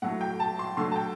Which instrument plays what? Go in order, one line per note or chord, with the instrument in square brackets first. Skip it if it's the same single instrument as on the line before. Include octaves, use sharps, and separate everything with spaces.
[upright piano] A2 F#3 A3 F#5
G5
A5
C6
D3 F#3 A3 C6
A5
G5